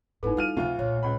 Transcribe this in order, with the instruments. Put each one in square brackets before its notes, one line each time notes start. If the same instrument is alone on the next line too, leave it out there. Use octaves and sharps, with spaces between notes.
[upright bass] G1 G#2 [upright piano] B3 [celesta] D#4 E4 A4
[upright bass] G3 [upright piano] F4 F6 D#7
[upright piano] D2 F4 [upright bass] C3 F3
[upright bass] B1 A#2 [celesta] C#5
[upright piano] C#2 B5